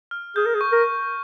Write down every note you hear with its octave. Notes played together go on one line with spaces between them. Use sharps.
F6
G#4 G6
A#4
G#4
C#6
A#4
C#6